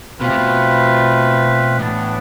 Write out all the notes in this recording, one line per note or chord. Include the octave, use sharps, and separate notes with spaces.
B2 F3 A3 C4 F4 B4
C3
B2
A2 E3 B3 D4